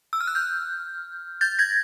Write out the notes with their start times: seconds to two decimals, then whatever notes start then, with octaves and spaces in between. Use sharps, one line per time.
0.13 E6
0.21 F6
0.27 F#6
0.35 F6 G6
1.41 G6 A6
1.59 G#6 A#6